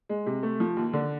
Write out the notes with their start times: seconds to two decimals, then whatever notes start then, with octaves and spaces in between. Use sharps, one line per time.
0.09 G#3
0.26 C3
0.43 A3
0.60 F3
0.77 D#2
0.93 D3